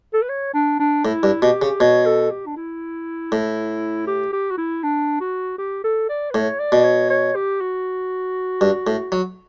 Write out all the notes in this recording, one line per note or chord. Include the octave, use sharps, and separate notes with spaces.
A4
B4
C#5
D4
D4
A2 E4
G2
B2 G4
C#3
B2 C#5
A4
G4
D4
E4
A2
G4
G4
F#4
E4
D4
F#4
G4
A4
D5
B4
A2 C#5
D5
B2
C#5
C#5
G4
F#4
G2
A2
F#3